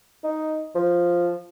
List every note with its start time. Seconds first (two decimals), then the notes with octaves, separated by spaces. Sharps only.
0.24 D#4
0.75 F3